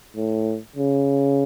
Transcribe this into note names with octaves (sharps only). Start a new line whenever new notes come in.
A2
C#3